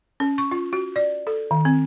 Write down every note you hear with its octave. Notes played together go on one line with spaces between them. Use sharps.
C#4
C#6
F4
F#4
D5
A4
D#3
C4